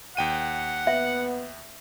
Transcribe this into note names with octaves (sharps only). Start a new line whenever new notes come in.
D#2 F#5 G5 D#7
B3 E5